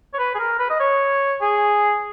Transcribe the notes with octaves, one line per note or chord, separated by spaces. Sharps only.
C#5
B4
G#4
A#4
B4
D#5
C#5
G#4